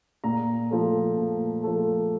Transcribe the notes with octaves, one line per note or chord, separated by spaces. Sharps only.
A#2 A#5
F3 A3
A#2
F3 A3